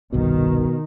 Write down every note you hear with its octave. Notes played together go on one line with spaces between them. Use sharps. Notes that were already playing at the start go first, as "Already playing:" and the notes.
G1 C2 G2 B2 D#3